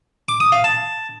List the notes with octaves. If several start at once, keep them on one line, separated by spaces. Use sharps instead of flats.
D6
D#6
F5
A5